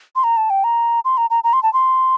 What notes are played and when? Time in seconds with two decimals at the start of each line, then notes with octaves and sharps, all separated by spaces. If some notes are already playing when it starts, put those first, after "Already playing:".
0.16 C6
0.24 A#5
0.37 A5
0.50 G5
0.64 A#5
1.05 C6
1.17 A#5
1.30 A#5
1.44 A#5
1.53 C6
1.63 A5
1.74 C6